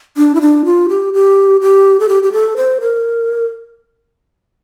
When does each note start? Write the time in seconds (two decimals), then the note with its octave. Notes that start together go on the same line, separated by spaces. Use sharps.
0.17 D4
0.35 E4
0.41 D4
0.65 F4
0.89 G4
1.14 G4
1.62 G4
2.00 A4
2.09 G4
2.23 G4
2.33 A4
2.57 C5
2.81 A#4